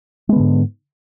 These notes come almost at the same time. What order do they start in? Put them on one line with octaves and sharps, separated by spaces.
G#3 B3 D3 G#2